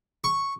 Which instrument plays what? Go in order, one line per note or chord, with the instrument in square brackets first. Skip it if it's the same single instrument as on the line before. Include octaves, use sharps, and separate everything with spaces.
[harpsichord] C#6